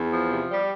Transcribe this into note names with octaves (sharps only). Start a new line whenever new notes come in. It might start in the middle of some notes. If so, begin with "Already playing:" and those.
Already playing: E2
F3
C3
G3